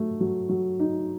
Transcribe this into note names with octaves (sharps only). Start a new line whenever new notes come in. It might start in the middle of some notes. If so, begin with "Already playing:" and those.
Already playing: F#3 A3
F#3
F#3
D#4